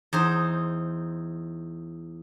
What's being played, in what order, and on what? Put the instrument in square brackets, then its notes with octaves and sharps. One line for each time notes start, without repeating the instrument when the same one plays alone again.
[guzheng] E2 D#4 C5